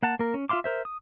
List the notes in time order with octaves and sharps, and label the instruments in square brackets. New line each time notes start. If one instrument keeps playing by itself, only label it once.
[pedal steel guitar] A#3 F#5 A5
A#3 A#4
C#4
F4 E5 F5 C6 D6
A#4 C5 E5
D#6